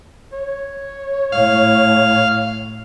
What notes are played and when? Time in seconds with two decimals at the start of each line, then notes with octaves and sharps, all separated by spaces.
0.33 C#5
1.32 A2 F5